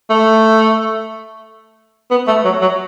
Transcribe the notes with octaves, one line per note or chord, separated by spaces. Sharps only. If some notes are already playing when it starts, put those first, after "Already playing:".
A3
B3
A3
F#3
F#3